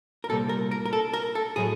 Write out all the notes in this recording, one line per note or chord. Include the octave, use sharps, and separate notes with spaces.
A#4
C2 A#2 G3 A4
A#4
A#4
A#4
A4
A#4
A4
A2 F#3 A3 G#4